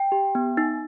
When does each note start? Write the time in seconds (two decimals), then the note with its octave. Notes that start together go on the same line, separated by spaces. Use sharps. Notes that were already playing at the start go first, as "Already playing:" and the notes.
Already playing: G5
0.12 G4
0.35 B3
0.57 D#4